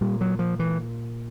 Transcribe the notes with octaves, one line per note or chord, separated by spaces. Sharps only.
A#2 G3
F#3
F3
E3